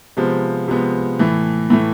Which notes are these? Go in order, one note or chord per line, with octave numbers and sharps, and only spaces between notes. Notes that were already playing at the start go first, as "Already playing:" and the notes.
C3 F3 G#3 B3
C3 F3 G#3 B3
A2 E3 A3
A2 E3 A3